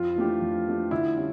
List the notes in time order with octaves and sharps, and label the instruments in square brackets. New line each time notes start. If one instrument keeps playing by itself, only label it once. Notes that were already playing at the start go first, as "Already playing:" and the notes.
Already playing: [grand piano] F2 [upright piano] F4
[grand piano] E3 A3 D4 G4
F2
E3 A3 D4 G4
[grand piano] D3 [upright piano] E4
[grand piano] G3 C#4